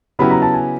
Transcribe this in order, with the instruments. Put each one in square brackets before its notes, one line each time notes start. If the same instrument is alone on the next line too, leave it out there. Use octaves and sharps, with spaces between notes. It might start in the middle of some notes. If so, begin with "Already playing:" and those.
[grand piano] C#3 F#3 B3 E4 G4 [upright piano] B5
[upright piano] A#5
A5
G#5